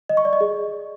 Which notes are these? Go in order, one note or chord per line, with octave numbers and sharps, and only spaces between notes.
D#5
C#6
D5
D#5
G#4